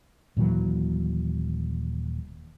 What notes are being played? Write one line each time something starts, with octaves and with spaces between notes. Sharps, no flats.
D#1 A#2 E3 F#3